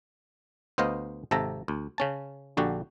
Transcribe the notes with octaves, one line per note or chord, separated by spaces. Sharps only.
D2 B3 C5 D#5 F5
G#1 C3 A4 A#5
D2
C#3 C#4 A5
A#1 D3 F#4 G4